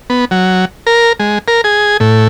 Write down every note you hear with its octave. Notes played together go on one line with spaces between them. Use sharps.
B3
F#3
A#4
G#3
A#4
G#4
A2